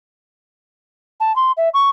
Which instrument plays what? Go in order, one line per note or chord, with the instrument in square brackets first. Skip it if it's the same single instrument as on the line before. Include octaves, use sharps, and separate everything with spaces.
[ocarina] A5
C6
E5
C#6